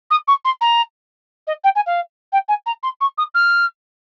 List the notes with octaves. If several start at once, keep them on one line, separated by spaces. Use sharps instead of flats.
D#6
C#6
C6
A#5
D#5
G5
G#5
F5
G5
G#5
A#5
C6
C#6
D#6
F6